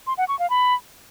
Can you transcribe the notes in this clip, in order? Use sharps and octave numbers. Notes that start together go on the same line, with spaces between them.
C6
F#5
C#6
F5
B5